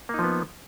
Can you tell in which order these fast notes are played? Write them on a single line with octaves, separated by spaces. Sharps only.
A#3 D#4 F3 B3